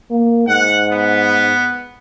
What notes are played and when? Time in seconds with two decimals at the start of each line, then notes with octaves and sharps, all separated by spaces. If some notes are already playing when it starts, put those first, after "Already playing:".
0.11 A#3
0.48 G#2 F#5
0.92 B3